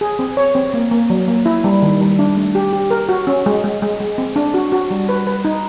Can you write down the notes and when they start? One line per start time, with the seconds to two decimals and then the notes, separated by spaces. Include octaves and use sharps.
0.01 G#4
0.19 C4
0.37 C#5
0.55 C4
0.74 A#3
0.91 A#3
1.10 F#3
1.28 A#3
1.46 E4
1.64 G3
1.82 D#3
2.01 G3
2.19 D4
2.37 A3
2.55 G4
2.73 G4
2.91 A#4
3.09 F#4
3.27 C#4
3.46 G#3
3.64 G#3
3.82 G#3
4.00 G#3
4.18 C4
4.36 D4
4.54 F#4
4.72 F#4
4.91 G3
5.09 B4
5.27 B4
5.45 D#4